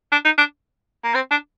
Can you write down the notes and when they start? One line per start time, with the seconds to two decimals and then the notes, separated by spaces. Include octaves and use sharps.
0.12 D4
0.25 D#4
0.38 D4
1.04 A#3
1.15 C4
1.31 D4